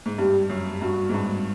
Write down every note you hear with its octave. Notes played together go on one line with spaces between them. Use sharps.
G#2
G2 G4
F#2
G2 F#4
G#2
G2